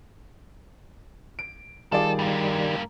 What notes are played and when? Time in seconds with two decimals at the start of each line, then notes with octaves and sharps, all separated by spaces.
1.39 D7
1.92 D#3 G3 F4 G#4 A4 D5
2.19 G2 A#3